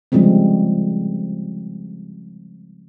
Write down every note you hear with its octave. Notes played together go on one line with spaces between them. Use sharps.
C#3 F3 G3 G#3 C4